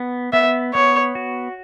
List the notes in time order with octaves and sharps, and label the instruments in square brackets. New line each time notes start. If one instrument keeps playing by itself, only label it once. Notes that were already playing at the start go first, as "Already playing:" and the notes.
Already playing: [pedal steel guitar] B3
[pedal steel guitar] B3 [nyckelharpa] E5
[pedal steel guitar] B3 [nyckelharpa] C#5
[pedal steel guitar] F#4